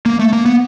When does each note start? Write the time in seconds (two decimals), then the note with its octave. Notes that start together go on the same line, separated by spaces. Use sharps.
0.06 A#3
0.19 A3
0.33 A#3
0.46 B3